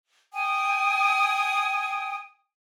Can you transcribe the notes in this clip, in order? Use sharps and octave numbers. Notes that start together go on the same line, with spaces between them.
G5 G#5 D#6